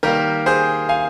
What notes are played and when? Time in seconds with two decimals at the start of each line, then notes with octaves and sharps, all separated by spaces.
0.03 D#3 G3 A#3 G4 A#4
0.46 G#4 C5
0.89 F5 G#5